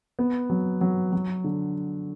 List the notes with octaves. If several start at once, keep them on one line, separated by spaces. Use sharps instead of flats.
B3
F#3
F#3
F#3
D3